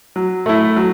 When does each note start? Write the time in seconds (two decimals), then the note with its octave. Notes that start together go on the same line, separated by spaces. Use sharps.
0.16 F#3
0.46 A3 E4
0.76 F#3